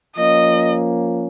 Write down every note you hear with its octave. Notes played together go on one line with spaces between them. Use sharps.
F3 A#3 C#4 D#5